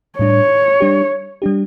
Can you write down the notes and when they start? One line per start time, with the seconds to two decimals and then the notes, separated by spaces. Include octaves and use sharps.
0.19 A2 G3 D4 C#5
0.80 G3 D4 G4
1.42 G3 D4 G4